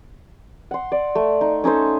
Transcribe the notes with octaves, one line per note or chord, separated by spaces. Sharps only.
F#5 C6
D5
A3
D#4
C#4 D#4 A4 C5